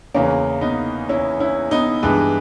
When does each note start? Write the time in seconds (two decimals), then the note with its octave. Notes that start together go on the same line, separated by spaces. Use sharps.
0.14 E2 C#3 E3 A#3 C#4
0.61 B3 D#4
1.09 C#4 E4
1.40 C#4 E4
1.71 B3 D#4
2.03 G2 E3 G#3 B3